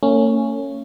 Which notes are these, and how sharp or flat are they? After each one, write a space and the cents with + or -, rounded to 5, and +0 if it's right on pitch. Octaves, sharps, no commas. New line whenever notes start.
A#3 -45 C#4 +0